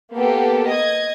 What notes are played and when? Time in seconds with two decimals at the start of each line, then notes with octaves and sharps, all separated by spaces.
0.14 A#3 B3 G4 A4
0.69 D#5 G#6